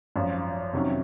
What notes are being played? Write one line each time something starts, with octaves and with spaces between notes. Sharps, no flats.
G#1 F#2 F3
F2 C3 D#3 F#3 C#4